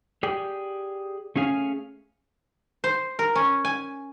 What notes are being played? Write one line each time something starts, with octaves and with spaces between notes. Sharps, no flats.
G4 G#4 D5 G5
A3 C#4 G#4 F5 G#5
C5
A#4
C#4
G#5